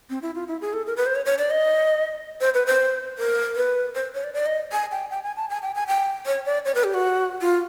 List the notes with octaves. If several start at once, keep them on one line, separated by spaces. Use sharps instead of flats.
C4
E4
F4
E4
G#4
A4
A#4
B4
C5
C#5
C#5
D5
D#5
C5
B4
C5
A#4
B4
C5
C#5
D5
D5
D#5
G#5
G5
G5
G#5
A5
G#5
G5
G#5
G5
C#5
D5
C#5
B4
G4
F#4
F4